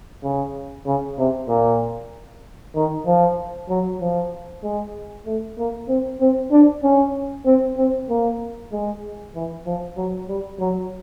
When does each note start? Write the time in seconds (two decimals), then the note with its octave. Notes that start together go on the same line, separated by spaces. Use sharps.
0.24 C#3
0.87 C#3
1.19 C3
1.49 A#2
2.75 D#3
3.06 F3
3.70 F#3
4.01 F3
4.64 G#3
5.26 A3
5.58 A#3
5.89 C4
6.21 C4
6.52 D4
6.83 C#4
7.46 C4
7.78 C4
8.09 A#3
8.72 G#3
9.35 E3
9.66 F3
9.97 F#3
10.29 G3
10.60 F#3